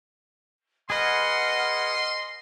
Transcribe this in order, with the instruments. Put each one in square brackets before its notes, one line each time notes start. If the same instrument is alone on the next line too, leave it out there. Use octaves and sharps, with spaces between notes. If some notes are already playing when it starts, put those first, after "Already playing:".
[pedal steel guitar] G#4 B4 [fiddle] D#5 [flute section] F#5 F6 [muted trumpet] C6